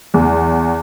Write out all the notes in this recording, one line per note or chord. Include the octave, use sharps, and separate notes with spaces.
E2